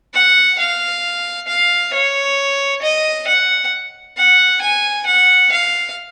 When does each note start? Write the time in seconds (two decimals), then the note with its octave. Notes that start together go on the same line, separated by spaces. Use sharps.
0.14 F#5
0.59 F5
1.48 F5
1.93 C#5
2.82 D#5
3.27 F#5
4.17 F#5
4.61 G#5
5.06 F#5
5.51 F5